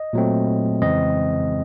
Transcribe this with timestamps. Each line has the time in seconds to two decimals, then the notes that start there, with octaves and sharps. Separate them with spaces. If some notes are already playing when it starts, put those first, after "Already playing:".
Already playing: D#5
0.13 A#2 F#3 A3 C4
0.82 F2 C#3 E3 G#3 C4 D#5